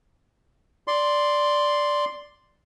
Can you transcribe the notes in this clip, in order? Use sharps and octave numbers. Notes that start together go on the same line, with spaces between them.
D5 C6